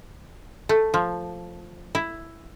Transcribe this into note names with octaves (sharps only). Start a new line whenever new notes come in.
A3
F3
E4